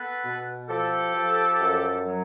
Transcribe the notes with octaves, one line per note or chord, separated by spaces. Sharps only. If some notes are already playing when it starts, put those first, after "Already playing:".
Already playing: B3 A4 B4
B2
F3 G4 A4
F3
F#2
F#3